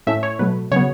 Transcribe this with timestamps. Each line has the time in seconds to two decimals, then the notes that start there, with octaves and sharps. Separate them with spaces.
0.07 A2 A3 C#4 E5
0.23 C#5
0.39 B2 F#3 A3 B4
0.71 C#3 F#3 B3 C#5